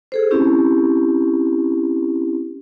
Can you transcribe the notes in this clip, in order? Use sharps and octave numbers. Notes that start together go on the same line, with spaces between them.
G#4 A4 C5
C4 C#4 E4 G4